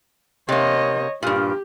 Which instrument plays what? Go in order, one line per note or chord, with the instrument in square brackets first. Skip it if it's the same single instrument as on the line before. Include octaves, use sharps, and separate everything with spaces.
[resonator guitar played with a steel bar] C3 A#3 [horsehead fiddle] C#5 D#5
[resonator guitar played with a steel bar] G2 A#2 [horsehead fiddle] G4